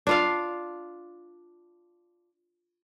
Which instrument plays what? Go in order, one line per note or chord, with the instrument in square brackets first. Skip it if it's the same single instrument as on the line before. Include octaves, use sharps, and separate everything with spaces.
[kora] D4 F4 F5